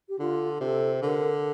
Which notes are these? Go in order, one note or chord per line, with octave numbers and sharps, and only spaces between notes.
G4
D3 F4
C3 A4
D3 A#4